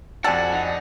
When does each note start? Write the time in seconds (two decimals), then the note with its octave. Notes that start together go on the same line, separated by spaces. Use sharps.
0.24 F2 F#4 G4 A4 D5 F#5 G#5 A6
0.52 D#4